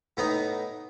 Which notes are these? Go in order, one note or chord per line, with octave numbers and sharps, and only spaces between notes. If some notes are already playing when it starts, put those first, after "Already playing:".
A2 B3 D#4 A#5